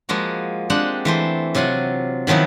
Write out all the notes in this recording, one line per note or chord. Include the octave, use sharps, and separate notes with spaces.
F3 G#3 A#3 F#4
G#3 C4 D4 G4 F#5
E3 A3 C5
C3 F#3 F4 F#5 G#5
D#3 F3 F#3 B3 E4